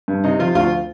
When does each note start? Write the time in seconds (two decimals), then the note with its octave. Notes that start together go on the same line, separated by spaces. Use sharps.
0.08 G2
0.24 C3 D#4
0.39 F3 F4
0.55 D2 F4